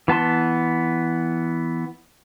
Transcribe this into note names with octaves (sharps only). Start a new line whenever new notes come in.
E3 B3 A5 C6